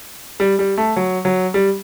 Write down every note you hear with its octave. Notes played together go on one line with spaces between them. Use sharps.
G3
G3
A3
F#3
F#3
G3